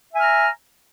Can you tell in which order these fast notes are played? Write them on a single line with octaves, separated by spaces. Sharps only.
E5 G#5 F6 A#5